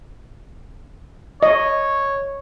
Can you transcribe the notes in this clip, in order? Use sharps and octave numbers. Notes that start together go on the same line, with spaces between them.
C#5 D#5